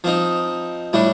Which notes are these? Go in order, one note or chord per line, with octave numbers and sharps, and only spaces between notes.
F3 C4 D#4
A2 G3 D4